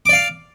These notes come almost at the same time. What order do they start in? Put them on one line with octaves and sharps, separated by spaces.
D6 D5 F5